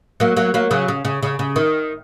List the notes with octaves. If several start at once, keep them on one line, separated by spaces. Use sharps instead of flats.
F#3 A#3
F#3 A#3
F#3 A#3
C#3 F#3
C#3
C#3
C#3
C#3
D#3